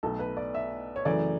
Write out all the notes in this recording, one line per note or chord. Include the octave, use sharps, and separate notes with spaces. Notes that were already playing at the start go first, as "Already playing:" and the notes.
B1 B2 A3 A4
B4
D5
E5
C#5
F#2 C#3 E3 A3 D5